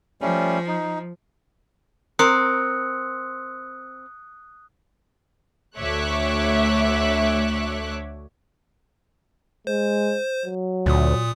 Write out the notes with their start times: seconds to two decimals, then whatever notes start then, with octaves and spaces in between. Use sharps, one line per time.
0.21 F3 G3 A3 C#4
0.67 D#4
2.19 C4 A#4 D#6 F#6 C#7
5.78 D2 A3 C#5 E5 D6 F#6
9.67 G#3 C5
10.45 F#3
10.86 D2 A#2 D#6